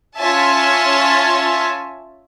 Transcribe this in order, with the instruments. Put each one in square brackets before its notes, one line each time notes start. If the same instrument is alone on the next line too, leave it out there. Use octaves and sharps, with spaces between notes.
[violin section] C#4 F4 C#5 E5 G#5 A5